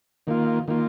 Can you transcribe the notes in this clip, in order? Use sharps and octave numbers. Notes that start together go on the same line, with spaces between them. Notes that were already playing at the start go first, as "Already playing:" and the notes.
D#3 A#3 F4
D#3 A#3 F4